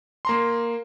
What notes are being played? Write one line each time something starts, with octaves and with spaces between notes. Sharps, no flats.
A#3 A#5 C6